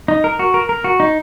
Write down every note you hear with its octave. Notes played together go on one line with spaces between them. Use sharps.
D#4
A#4
F#4
A#4
A#4
F#4
D#4